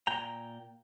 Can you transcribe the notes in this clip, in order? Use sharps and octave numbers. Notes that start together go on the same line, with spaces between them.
A#2 G5 A#5